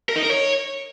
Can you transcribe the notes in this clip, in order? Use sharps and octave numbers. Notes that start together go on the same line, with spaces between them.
A#4
D#4
A#4
C#5